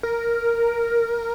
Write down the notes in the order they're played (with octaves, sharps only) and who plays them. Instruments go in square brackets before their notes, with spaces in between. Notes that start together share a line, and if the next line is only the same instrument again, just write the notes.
[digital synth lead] A#4